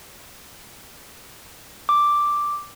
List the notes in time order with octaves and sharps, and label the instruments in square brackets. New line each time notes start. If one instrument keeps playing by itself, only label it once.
[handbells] D6